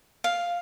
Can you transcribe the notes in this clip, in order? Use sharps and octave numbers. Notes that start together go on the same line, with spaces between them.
F5